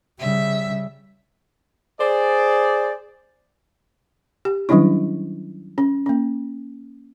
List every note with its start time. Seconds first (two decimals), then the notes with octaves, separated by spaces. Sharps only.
0.19 C#3 G3 E5
2.00 G#4 C5 D5
4.45 G4
4.69 D#3 F#3 G3 C#4 D4 E4
5.78 C#4
6.06 A#3 C#4